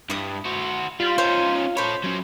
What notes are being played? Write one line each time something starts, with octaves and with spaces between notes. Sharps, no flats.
G2 E4 D#6
F#4 C5
G3 F4
C#4 D#4 C5
A4 C5 C#5 B5
F#3 C#4